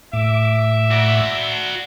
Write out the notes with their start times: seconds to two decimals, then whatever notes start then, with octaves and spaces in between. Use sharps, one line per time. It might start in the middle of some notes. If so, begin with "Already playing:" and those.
0.13 A2 E5 D6
0.91 F#4 D5